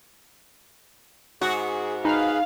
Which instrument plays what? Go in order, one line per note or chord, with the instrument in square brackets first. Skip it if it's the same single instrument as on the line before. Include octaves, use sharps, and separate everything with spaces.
[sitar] G#2 F#4 [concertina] G#4
[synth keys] D#4 F6 [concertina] G#4 B4 B5 [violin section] F5